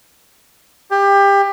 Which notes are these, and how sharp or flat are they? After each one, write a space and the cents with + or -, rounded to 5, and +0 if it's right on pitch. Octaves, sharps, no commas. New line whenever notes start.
G4 +25